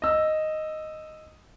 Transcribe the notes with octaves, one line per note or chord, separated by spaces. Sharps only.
D#5 E6